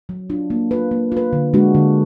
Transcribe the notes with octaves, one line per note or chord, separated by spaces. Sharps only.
F#3
D4 F4
A#3
F4 B4
A#3
F4 B4
D3
G#3 D4 F#4
D3